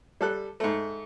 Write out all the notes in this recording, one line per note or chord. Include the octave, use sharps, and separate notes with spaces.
G3 A4 F#6
G#2 A3